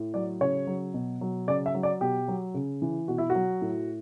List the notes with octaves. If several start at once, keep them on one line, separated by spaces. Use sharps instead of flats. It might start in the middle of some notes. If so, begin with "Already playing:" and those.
Already playing: A2
F#3 D5
C#3 C#5
F#3
B2
F#3
C#3 D5
E5
F#3
D5
B2 G4
F#3
C#3
E3
B2 F#4
E4
F#4
F#3
A2